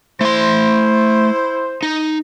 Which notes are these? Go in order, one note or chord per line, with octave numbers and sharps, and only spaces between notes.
A3 E4 C5 C6
D#4